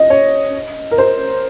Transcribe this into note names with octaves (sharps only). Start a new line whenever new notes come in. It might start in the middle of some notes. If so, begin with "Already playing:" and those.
Already playing: D#5
C#5
A#4
C5